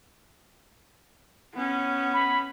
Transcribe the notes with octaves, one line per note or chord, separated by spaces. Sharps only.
B3 C#4
B5